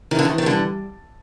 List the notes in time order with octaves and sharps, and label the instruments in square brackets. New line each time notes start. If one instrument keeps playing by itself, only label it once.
[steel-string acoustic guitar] D#3 [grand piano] E3
[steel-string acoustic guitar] D3
D#3
[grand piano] E3
[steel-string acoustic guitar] D#3
[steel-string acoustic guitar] D3 [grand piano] G3